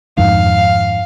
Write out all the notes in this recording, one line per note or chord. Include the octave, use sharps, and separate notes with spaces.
F2 G#2 D#3 F5